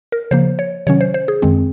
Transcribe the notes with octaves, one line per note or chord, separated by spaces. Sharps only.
A#4
C#3 F3 A#3 C5
C#5
C3 D#3 F#3 C#4 C#5
C5
C5
G#4
F#2 D#3 G#3 C4